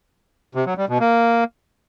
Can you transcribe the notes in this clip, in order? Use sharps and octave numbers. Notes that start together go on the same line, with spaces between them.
C3
F#3
G3
B2
A#3